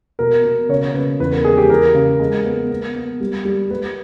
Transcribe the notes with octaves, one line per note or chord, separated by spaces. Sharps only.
B2 A#4
B2
C#3 C#5
C#3 B4
E2 B4
A#4
G#3 G#4
G4
E3 A#4
C#3
G#3
B3
B3
B3
G3
G3
G3 B4